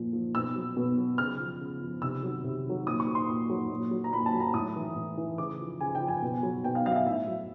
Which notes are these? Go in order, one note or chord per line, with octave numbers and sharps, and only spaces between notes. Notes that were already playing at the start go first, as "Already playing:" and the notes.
Already playing: A#2 F3
F3
B2 E6
F#3
B2
F#3
C#3 F6
F3
C#3
F3
C3 E6
D#3 F#3
C3
D#3 F#3
A#2 D#6
C#6
F#3
C6
A#2
F#3
A#2
F#3
A#5
A#2 B5
A5
F#3
A#5
A2 D#6
E3
A2
E3
C#3 D6
F3
C#3 G#5
G5
F3
G#5
B2
F#3
B2 G5
F5
F#3 F5
E5
F5
A2 E5
F#3